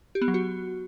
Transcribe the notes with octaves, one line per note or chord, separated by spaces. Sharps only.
G4
B3
F#3
F#4